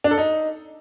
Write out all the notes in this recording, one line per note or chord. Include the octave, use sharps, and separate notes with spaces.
D4
A4
D#4